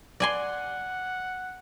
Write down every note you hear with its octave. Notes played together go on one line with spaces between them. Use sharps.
D5 F#5 G#5 C6